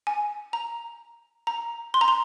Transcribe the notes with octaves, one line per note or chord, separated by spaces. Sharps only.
G#5
A#5
A#5
C6
A#5
C6